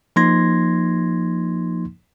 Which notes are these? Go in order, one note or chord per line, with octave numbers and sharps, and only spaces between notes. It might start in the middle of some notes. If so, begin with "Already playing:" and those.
F3 A#3 D#4 C6 G#6 A#6